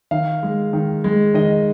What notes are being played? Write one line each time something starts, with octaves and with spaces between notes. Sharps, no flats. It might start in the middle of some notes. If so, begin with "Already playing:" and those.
D#3 F5
G#3
D#3
G#3
D#3 D#5